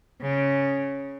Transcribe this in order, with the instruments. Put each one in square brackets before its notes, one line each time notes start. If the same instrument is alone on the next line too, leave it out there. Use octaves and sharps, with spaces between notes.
[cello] C#3